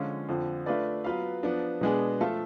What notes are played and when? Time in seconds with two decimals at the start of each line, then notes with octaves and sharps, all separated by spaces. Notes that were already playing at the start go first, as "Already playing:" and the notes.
Already playing: D3 F3 G#3 C#4 F4
0.29 F2 D3 F3
0.66 A3 D4 F4 B4 D5
1.04 F#3 B3 F4 B4 F5
1.43 F3 B3 D4
1.81 B2 G#3 B3 D4 G#4
2.20 F3 A3 F4 A4